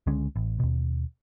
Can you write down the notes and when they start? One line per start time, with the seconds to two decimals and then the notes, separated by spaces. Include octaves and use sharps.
0.07 C#2 D3 G#3 C#4
0.36 A1
0.60 D#2 B2